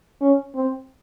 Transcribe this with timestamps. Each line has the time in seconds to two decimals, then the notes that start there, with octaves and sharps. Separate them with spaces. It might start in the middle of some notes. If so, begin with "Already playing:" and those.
0.21 C#4
0.55 C4